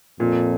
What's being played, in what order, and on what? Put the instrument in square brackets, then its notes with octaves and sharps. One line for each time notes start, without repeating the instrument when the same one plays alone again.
[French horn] F2 [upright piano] A#2